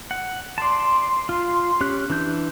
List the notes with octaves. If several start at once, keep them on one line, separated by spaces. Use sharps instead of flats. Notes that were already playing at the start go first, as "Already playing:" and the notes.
F#5
D5 A5 C6
F4
C#4 G4 F#6
E3 D4 G6